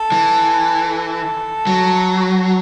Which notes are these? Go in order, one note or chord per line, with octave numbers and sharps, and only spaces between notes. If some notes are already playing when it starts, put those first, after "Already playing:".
Already playing: A4
E3
A4
F#3